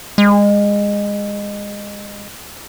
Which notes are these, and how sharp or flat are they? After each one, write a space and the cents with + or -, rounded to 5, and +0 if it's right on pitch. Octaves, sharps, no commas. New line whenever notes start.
G#3 -25